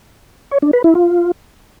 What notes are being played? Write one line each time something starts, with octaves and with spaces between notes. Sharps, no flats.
C#5
D4
B4
E4
F4